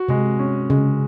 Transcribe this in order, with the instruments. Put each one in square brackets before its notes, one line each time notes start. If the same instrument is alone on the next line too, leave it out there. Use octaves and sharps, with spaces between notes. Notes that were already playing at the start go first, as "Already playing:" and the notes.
Already playing: [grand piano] F#4
[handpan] C3 [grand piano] G#3
[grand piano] C#4
[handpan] C#3 [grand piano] G#3